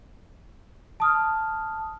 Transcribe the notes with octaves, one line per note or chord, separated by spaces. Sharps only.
A5 D#6 F6